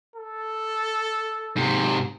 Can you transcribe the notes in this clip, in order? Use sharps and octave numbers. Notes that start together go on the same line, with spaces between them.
A4
G#2 C3